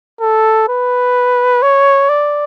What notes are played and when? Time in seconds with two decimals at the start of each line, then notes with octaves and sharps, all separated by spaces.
0.21 A4
0.68 B4
1.62 C#5
2.09 D5